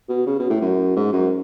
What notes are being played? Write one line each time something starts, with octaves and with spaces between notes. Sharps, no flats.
B2
C#3
B2
A2
F#2
G#2
F#2